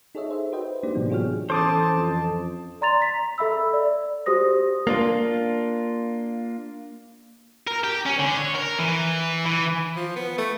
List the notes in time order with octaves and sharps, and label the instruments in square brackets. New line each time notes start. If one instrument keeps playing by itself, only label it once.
[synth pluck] D#4 G#4 A4 C#5 D#5 E5
C5 E5
F#4 B4 C5 D#5 G5
A#3 D4 D#4 G4 C5 D5
A2 C3 E3 F#3 B3
F4 F#4 G#4 C#5 G5 F6
[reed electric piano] E3 C#4 A4 [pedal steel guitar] C5 D6 D#6 [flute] A5
[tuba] F2
[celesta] D5 A#5 C6 A6 F7
B6
A4 E5 B5 E6
D5
F#4 G4 C5 D#6 A#6
[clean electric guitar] A#3 D4 F4
[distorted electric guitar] A#4
G4
C#4
D3
C#5
A#4
E3
E3
[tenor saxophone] F3
B3
A3